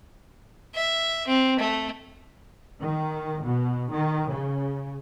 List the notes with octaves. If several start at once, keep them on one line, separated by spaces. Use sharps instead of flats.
E5
C4
A3
D#3
B2
D#3
C#3